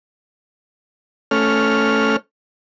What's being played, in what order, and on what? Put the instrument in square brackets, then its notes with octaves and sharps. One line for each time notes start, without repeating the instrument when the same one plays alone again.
[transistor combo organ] A3 C#4 F6